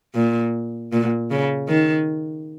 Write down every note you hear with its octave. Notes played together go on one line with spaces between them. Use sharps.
A#2
A#2
C#3
D#3